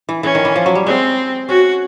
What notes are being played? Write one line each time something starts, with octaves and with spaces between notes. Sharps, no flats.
E3
E3 C#4
D#3
E3
F3
F#3
G3
G#3 C4
C#4 F#4